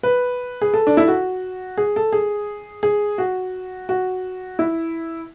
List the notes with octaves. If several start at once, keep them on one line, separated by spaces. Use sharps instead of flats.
B4
G#4
A4
D4
E4
F#4
G#4
A4
G#4
G#4
F#4
F#4
E4